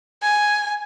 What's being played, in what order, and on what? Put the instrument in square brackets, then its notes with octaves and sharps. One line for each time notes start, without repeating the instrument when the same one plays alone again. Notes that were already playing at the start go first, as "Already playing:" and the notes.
[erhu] G#5